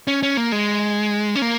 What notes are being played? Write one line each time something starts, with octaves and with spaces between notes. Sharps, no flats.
C#4
C#4
A#3
G#3
C#4
A#3